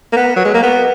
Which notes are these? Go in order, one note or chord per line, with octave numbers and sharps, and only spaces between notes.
A#3
B3
F#3
G#3
A#3
B3